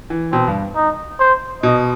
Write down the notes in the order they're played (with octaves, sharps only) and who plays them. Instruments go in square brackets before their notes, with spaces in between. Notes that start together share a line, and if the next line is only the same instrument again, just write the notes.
[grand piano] E3
[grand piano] B2 [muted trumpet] C4
[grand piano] G2
[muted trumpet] D#4
C5
[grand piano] B2 [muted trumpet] D#5